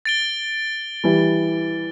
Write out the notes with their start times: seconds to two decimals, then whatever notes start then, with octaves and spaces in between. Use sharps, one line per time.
0.05 A6 D7 G7
1.04 E3 G3